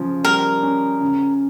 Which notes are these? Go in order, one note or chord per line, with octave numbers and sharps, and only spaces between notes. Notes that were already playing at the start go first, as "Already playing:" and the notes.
Already playing: C#3 F3
G3 A#4
C#4
C#3